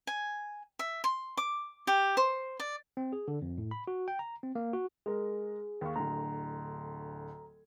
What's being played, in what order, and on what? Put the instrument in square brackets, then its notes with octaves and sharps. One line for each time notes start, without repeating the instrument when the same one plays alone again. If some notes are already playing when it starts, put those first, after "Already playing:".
[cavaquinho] G#5
E5
C6
D6
G4
C5
D5
[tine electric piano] C4
G#4
D3
F2
A2
B5
F#4
G5
A#5
C4
A#3
F#4
[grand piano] G#3 A#4 [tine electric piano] G#4
[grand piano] D#2 F5 C#6
[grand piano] D1 D2 [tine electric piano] A#5